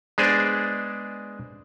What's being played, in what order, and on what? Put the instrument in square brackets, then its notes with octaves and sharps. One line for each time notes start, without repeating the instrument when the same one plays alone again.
[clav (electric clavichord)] G#3 B3 D4 G#4 C5 D5